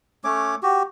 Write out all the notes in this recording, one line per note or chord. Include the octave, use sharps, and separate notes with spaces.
A3 C#4 C#5 D6
F#4 G4